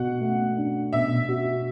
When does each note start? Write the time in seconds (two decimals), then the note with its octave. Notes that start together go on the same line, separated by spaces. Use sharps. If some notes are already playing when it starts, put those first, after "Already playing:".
Already playing: B2 F#4 F#5
0.21 A3
0.57 D4
0.93 B2 E5
1.29 F#4